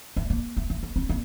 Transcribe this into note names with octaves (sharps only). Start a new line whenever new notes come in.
A3
A#3
A3
A3
A#3
C4
A#3